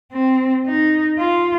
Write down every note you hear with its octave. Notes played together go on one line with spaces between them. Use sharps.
C4
D#4
F4